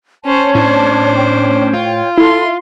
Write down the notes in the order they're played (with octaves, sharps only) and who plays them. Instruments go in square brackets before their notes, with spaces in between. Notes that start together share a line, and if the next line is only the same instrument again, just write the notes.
[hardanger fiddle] C#4 C5 [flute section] C#5 A5
[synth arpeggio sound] A2 [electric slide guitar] C#4 D4 [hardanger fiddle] C5
[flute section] C#5 G5
[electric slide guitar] F4
[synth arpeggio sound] E4 [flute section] A4 [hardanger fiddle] C6